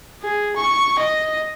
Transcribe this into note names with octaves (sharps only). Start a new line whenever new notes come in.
G#4
C#6
D#5